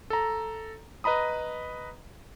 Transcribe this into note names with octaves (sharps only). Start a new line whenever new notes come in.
A4 A#5
B4 D#5 A#5 B5 D#6